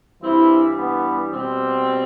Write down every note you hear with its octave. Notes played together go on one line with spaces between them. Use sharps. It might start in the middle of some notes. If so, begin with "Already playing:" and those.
G2 E3 G3 C4 E4
B3
B2 G3 C4